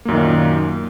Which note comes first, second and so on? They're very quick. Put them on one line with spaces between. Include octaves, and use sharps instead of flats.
A#3 F#2 D#3 A#2